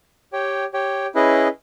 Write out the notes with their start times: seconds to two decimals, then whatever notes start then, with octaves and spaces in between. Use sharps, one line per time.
0.33 G4 C#5 G5
0.73 G4 C#5 G5
1.15 C#4 E4 G#4 B4 D#5